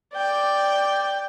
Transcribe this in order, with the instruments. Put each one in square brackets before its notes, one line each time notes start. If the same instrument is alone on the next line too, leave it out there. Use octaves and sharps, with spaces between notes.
[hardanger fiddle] D5 G5